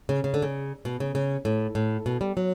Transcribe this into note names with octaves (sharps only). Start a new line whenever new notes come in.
C#3
C#3
D3
C#3
B2
C#3
C#3
A2
A2
B2
G3
F#3